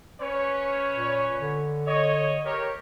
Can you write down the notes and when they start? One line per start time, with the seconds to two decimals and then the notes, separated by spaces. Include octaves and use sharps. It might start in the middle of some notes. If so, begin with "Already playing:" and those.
0.21 C#4 B4 C#5
0.90 A#2
1.38 D3
1.87 C#5 D#5
2.44 G4 A#4 C#5